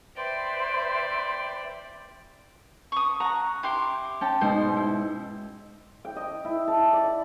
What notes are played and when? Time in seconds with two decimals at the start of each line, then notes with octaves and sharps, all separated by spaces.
0.16 B4 C5 D5 E5 G5
2.92 C#6 D#6
3.20 F#5 A#5
3.63 E4 G4 C6
4.21 C#4 G5 A5
4.41 G#2 B2 D#4 C5
4.76 E4
6.05 G5
6.16 D#5
6.45 E4
6.68 A5
6.93 D5